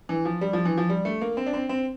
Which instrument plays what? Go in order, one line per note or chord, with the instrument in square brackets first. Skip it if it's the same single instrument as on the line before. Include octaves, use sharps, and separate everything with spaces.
[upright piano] E3
F3
G3
F3
E3
F3
G3
A3
A#3
C4
D4
C4
C4